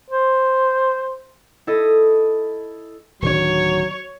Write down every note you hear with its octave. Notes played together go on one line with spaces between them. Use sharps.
C5
E4 A4 D#5
D1 D#3 F#3 D4 C#5